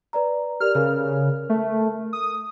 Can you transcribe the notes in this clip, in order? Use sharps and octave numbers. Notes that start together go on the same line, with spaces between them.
B4 D5 A#5
G4 A#4 D5 F6
C#3 A#4 F6
A3
D#6